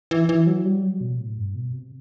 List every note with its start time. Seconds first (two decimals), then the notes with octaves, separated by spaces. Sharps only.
0.11 E3
0.29 E3
0.47 F#3
0.65 G3
0.83 F#3
1.01 B2
1.19 A2
1.38 G2
1.55 B2
1.73 C3